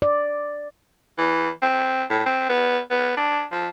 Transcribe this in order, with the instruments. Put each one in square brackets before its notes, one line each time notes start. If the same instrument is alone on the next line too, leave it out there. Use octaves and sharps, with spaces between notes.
[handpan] D5
[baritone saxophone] E3
C4
A2
C4
B3
B3
D4
F3